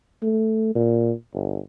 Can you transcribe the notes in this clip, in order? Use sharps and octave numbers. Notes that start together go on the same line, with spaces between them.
A3
A#2
G1